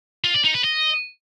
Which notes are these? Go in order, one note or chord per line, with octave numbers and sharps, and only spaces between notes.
F4
D5
D#4
B4
D#5